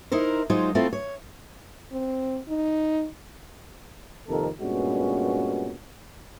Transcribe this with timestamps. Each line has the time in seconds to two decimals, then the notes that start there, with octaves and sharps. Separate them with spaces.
0.12 D#4 E4 A#4 C5
0.50 F#3 G#3 D#4 F4 C5
0.75 A3 C4 E4 F4
0.93 C#5
1.92 C4
2.48 D#4
4.28 F2 C3 D#3 A#3 A4 A#4
4.61 G2 A#2 G#3 B3 C#4 F#4